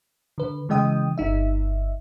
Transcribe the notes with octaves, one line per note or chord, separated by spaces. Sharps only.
D3 B4
C#3 E3 G#3 D#5 G5 D#6
G1 D#4 E5